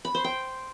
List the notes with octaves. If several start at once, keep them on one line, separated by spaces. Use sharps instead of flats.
B5
C5
G5